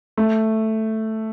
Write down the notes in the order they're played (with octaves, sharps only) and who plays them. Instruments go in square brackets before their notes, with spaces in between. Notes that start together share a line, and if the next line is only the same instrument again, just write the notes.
[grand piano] A3